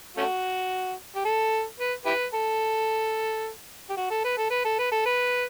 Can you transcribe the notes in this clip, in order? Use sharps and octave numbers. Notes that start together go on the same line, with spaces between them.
A3 C#4 F#4
G4
A4
B4
E4 G4 B4
A4
G4
F#4
A4
B4
A4
B4
A4
B4
A4
B4